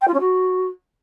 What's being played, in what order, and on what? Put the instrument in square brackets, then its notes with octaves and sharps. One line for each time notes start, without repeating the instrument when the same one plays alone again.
[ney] G5
F4
C#4
F#4